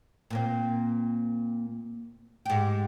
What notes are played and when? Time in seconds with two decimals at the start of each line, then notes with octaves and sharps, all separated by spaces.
0.30 A#2 A#3 C4
2.45 G#2 G4